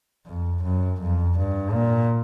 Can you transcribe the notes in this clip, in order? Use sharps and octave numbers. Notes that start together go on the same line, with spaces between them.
F2
F#2
F2
G2
A#2